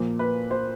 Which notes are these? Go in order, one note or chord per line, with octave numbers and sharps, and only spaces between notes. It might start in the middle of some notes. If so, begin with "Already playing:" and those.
Already playing: A#2 F3 A#3
B4
C5